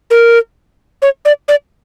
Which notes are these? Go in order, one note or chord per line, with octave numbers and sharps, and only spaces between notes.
A#4
C#5
D5
D5